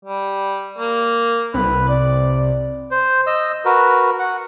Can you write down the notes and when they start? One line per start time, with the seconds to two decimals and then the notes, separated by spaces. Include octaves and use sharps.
0.05 G3
0.79 A#3
1.54 C2 B4
1.89 D5
2.91 C5
3.27 D#5 E6
3.65 F#4 A#4 B4
4.19 F#5